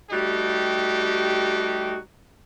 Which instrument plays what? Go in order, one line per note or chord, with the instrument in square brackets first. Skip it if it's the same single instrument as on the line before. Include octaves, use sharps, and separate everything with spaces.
[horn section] G3 A3 D#4 F#4 G4